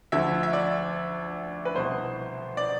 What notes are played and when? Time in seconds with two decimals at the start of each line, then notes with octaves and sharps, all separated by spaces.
0.12 D2 D3 F3 E5
0.43 E5
0.53 D5
1.65 B4
1.75 C2 B2 B3 C5
2.57 D5